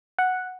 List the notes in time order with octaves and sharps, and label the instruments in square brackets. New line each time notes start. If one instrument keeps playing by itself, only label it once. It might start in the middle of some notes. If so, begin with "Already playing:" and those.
[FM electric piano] F#5